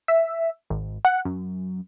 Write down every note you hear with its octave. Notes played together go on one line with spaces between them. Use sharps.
E5
G#1
F#5
F#2